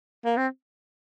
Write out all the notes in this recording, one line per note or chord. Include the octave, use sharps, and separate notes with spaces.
A#3
C4